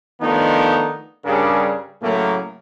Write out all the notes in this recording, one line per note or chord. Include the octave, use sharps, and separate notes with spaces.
D#3 F3 A3 B3 D4 D#4
G2 C#3 G3 D4 G#4 A#4
A2 C#3 F#3 A3 A#3